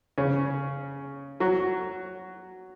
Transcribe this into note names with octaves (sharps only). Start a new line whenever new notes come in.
C#3 C#4
F#3 F#4